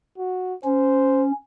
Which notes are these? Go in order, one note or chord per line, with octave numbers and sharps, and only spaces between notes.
F#4
C#4 C5